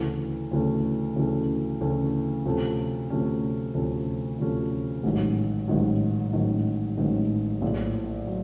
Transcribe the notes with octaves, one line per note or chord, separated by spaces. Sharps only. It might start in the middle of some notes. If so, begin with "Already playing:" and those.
Already playing: D2 C#3 E3 A3 C#4
D2 C#3 E3 A3 C#4
D2 C#3 E3 A3 C#4
D2 C#3 E3 A3 C#4
D2 C3 F3 A3 C#4
D2 C3 F3 A3 C#4
D2 C3 F3 A3 C#4
D2 C3 F3 A3 C#4
A1 G#2 D#3 F#3
A1 G#2 D#3 F#3
A1 G#2 D#3 F#3
A1 G#2 D#3 F#3
A#1 A2 F#3
F#3